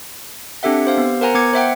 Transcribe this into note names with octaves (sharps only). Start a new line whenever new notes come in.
C4 D4 G4 A4 E5 F#5
G4 C5 F5
B3
A#4 C5 F#5 G#5 A#5
B3 D6 G#6 C#7
C5 E5 F#5 G5